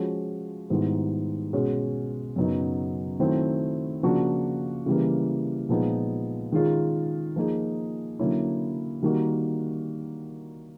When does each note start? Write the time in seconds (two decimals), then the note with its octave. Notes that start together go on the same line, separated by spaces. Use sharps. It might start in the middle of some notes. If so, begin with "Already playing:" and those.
Already playing: F3 G#3 C#4 F#4
0.70 G#2 D#3 G3 B3 E4
1.53 B2 G#3 C#4 F#4
2.36 F#2 C#3 F#3 B3 D#4
3.20 D#3 F#3 A3 C4 E4
4.03 C#3 F3 A#3 D4 F#4
4.86 C#3 E3 G3 A#3
5.69 A#2 F3 G#3 B3 D#4
6.52 D#3 G#3 C#4 F4 G#4
7.36 F3 A#3 D#4 G#4
8.19 D3 F#3 A#3 C#4 E4
9.03 D#3 G3 A#3 D#4 F#4